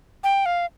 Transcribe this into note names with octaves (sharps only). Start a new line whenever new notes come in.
G5
F5